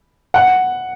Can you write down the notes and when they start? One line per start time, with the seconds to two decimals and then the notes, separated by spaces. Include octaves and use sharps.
0.34 F#5